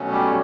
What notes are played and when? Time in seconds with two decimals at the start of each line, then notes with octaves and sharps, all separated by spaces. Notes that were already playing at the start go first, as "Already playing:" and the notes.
Already playing: B2 F#3 A3 C#4
0.11 G3 G4